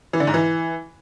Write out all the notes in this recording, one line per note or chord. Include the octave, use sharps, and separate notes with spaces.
E3
D3
G#2
E3